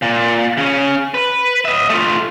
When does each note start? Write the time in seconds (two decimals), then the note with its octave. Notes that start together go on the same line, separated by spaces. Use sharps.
0.02 A#2
0.57 C#3 C#4
1.14 B4
1.65 D#5 E5
1.90 A3 F4